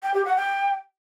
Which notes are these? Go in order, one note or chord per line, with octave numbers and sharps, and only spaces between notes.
G5
G4
F#5
G5